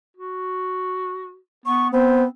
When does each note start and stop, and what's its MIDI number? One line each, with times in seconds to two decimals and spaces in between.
0.17 1.37 66
1.66 1.93 59
1.66 1.88 85
1.93 2.25 59
1.93 2.28 60
1.93 2.24 72